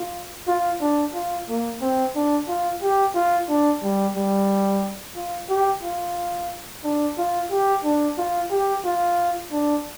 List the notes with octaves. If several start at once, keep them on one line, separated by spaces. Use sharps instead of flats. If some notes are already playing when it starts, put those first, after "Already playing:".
Already playing: F4
F4
D4
F4
A#3
C4
D4
F4
G4
F4
D4
G3
G3
F4
G4
F4
D4
F4
G4
D4
F4
G4
F4
D4